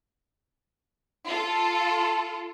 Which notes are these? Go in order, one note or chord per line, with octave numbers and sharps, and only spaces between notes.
F4 A4